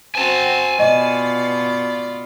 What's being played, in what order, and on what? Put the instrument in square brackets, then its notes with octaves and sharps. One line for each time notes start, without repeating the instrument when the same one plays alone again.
[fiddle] C4 F#4 [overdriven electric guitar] G#5 A5
[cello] B2 F4 [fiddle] D5 [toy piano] D#5